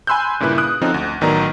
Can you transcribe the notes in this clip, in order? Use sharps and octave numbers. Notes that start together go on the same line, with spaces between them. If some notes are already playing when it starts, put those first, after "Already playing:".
G#5 B5 C6 E6 F#6 G6
G2 A#2 C#3 E4 B4 F#6
D#6 F#6
D3 F3 C4 C#4 D#4
D2
A1 D#3 F#3 B3 D5 A#5